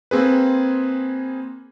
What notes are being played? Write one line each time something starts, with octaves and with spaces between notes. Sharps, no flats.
A#3 C4 G#4 B4